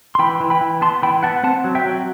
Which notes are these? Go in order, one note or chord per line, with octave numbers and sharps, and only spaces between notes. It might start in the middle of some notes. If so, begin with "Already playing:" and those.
C6
E3 G5 B5
E3
G5 B5
E3
B3 A5 C6
E3 G5 B5
B3 F#5 A5
C4 F#5 A5
F#3
E5 G5
F#3